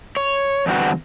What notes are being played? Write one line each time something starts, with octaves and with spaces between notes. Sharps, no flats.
C#5
E2 G2 D3 C4 F#4 F#5